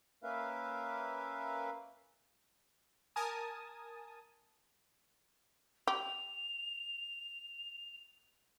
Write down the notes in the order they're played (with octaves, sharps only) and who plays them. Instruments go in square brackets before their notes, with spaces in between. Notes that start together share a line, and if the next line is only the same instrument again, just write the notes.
[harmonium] A#3 C#4 A#4 B4 E5 F5
[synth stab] A#4 G#5 A5 D#6
[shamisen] G4 [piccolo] F7